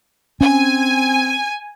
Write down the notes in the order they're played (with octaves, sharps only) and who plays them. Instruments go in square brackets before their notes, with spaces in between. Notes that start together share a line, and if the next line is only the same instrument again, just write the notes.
[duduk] C4 [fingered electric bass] C#4 [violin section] G#5